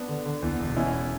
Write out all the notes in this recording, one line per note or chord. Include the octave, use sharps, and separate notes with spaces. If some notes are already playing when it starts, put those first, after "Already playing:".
Already playing: B3 D4
D3
D3
E2
E1
E2 C#4 E4